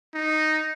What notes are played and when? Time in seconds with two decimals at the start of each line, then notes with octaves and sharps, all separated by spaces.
0.14 D#4